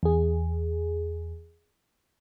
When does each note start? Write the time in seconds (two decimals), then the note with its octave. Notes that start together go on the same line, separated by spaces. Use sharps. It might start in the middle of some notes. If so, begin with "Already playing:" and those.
0.03 E2 G#4